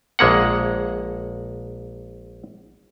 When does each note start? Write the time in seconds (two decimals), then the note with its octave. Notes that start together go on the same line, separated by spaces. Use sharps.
0.19 A#1 G#3 A#3 F#5